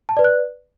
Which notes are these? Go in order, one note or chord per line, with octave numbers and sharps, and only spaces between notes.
A5
B4 D5
F#6